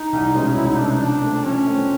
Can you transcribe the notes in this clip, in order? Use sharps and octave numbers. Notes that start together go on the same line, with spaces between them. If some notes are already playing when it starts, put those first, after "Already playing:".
Already playing: D#4
C2
B2 G#3 C#4
C2 E4
D#4
B2 G#3 C#4 D4
D#4
F3 D4
A3 C4
D4
F3 C#4
A3 C4